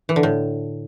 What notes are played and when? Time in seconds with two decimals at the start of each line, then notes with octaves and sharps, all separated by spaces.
0.09 E3
0.16 D3
0.23 A2